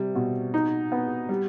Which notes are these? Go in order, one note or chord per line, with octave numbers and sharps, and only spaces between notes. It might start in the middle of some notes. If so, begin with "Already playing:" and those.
Already playing: C3 G3
B2
D#4
B3
G3